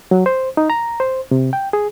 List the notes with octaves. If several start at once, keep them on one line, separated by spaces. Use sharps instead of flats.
F#3
C5
D#4
A#5
C5
C3
G5
G#4